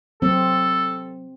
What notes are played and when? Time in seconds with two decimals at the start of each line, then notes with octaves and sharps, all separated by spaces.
0.22 F#3 C4 A4